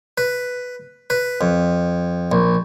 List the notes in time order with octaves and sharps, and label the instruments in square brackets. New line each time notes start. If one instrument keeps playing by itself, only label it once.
[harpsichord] B4
B4
F2
A#1